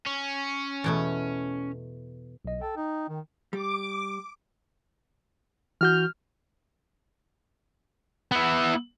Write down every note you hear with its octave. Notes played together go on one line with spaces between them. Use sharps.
C#4
E2 B2 A3
B1 D#5
A4 G5
D#4
D#3
G3 D6
E3 F#4 F6 G6
B3 E4